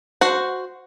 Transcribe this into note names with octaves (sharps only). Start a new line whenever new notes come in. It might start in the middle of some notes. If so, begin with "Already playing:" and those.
F#4 C5 F#5